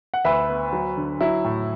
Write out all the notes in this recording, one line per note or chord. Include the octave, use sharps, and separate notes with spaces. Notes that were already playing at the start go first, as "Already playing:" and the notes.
F#5
D2 B4 E5
B3
F#3
D3
F#3 E4
A2